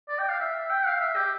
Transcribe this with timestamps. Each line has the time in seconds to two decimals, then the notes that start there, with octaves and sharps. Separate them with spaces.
0.09 D5
0.19 G5
0.28 F5
0.40 E5
0.70 G5
0.86 F5
1.00 E5
1.16 G4